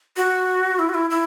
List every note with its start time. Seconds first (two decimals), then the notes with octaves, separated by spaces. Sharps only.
0.17 F#4
0.79 E4
0.89 F#4
0.94 E4
1.10 E4